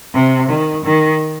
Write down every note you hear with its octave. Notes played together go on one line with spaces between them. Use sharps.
C3
D#3
D#3